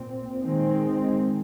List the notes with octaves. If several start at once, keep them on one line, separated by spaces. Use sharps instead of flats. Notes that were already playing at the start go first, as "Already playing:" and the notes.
Already playing: A#2 C4
D#3 G#3 C4